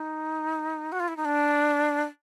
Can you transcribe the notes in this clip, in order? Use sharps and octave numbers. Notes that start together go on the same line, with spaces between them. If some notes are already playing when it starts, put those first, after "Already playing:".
Already playing: D#4
F#4
F4
E4
D#4
D4